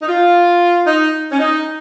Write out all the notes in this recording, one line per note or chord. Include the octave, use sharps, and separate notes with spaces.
D#4
F4
D#4
C#4
D#4